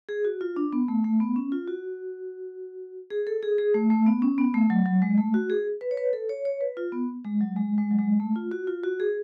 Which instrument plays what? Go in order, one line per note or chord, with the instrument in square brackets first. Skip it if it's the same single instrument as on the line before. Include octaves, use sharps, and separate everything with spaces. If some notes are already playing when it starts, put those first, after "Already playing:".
[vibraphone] G#4
F#4
F4
D4
B3
A3
A3
B3
C#4
F4
F#4
G#4
A4
G#4
G#4
A3
A3
B3
C#4
B3
A3
F#3
F#3
G#3
A3
F#4
G#4
B4
C#5
B4
A4
C#5
C#5
B4
F4
B3
G#3
F#3
G#3
G#3
F#3
G#3
A3
F4
F#4
F4
F#4
G#4